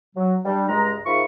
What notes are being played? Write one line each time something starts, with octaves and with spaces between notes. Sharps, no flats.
F#3
G3 D4
C#2 G2 G#3 D#5 A#5
G#2 F4 A#4 E5 B5 C#6